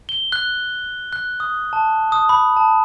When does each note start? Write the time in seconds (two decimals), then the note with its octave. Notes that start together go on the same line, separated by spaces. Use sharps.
0.09 G7
0.32 F#6
1.13 F#6
1.40 D#6
1.73 A5
2.12 D#6
2.29 B5
2.57 A5